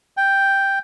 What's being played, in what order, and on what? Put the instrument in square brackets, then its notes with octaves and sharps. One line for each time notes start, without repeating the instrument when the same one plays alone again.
[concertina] G5